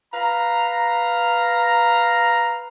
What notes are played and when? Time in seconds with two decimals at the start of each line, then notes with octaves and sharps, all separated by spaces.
0.13 B4 F5 A#5